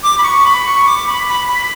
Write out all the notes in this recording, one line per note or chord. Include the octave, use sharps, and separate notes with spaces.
D6
B5
C#6
B5
C#6
D6
B5
B5
B5